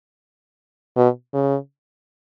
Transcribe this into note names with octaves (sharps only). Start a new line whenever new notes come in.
B2
C#3